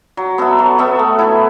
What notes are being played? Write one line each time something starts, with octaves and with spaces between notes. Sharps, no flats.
F#3
B3 A4 E5
F#3
B3 A4 E5
A3
E4 A4